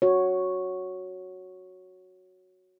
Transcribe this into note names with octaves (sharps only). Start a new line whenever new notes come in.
F#4 C#5